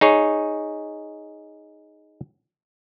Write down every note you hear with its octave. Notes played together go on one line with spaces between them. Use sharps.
D#4 G#4 C#5